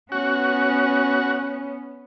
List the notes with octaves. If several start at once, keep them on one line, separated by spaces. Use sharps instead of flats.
B3 C#4 F#4